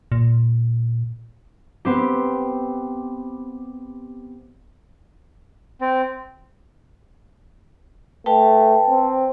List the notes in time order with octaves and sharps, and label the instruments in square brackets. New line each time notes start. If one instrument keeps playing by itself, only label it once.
[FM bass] A#2
[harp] B3 C4 G4
[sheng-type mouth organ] C4
[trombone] A3 [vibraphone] B4 G5 A5
[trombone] C4